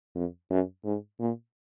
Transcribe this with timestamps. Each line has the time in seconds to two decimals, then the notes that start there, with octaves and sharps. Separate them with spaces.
0.15 F2
0.50 F#2
0.85 G#2
1.20 A#2